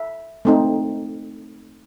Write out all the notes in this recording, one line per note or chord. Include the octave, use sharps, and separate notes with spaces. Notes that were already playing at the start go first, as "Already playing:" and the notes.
Already playing: E5
A3 C4 D#4